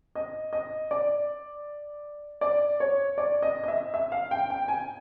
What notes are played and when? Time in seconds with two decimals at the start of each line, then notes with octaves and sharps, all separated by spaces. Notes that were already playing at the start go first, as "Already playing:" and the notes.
0.15 D#5
0.53 D#5
0.91 D5
2.41 D5
2.80 C#5
3.18 D5
3.42 D#5
3.64 D#5
3.68 E5
3.94 E5
4.12 F5
4.31 G5
4.50 G5
4.68 G#5